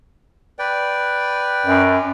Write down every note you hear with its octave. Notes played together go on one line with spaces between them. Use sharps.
B4 D5 G5
F#2